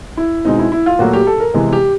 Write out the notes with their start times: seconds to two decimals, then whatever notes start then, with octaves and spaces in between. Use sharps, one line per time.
0.17 E4
0.45 B2 G#3 C4 D#4
0.59 E4
0.72 E4
0.86 F4
0.99 A#2 F#3 A3 F#4
1.13 G4
1.27 A4
1.40 A#4
1.54 C3 E3 G#3 B3
1.73 G4